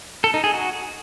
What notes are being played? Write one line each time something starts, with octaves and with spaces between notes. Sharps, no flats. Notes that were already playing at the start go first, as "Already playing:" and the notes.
A4
D#4
G#4
F#4